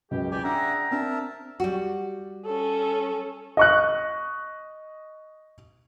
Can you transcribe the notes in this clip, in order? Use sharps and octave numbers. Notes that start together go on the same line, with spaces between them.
C#2 F#2 B2 F#4 G4
E3 F4 G4 D5 G#5
D4 G#4 D5 E5 F#5 G5 A#5
C4 D4 A#4 E5 A5
G3 F#4
C#4 A4
D#5 C#6 F#6